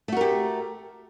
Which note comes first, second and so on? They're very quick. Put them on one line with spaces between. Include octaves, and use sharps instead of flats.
A3 F#4 A#4 G4